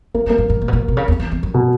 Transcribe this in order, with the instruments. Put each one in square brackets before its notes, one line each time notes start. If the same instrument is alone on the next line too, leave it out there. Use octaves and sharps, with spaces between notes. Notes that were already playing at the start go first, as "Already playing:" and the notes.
[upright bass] G#3 [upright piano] A#3
[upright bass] F#3
[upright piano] A#3
[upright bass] G#2
G#2
A#2
B2
A#2
B2
C#3
E2
E2
E2
F#2
[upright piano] B2